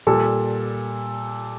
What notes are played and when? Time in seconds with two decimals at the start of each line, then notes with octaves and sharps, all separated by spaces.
0.07 A#2 G3 A4